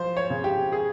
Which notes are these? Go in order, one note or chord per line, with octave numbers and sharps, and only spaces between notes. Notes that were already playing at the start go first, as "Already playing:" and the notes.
Already playing: F3 C5
C#5
C#3
G4
G#4